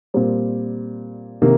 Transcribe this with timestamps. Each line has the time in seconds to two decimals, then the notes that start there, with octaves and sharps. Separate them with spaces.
0.14 A#2 G3 C4
1.42 C3 D#3 A#3